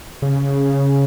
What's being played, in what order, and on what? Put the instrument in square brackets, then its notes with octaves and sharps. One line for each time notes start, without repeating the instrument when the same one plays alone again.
[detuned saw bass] C#3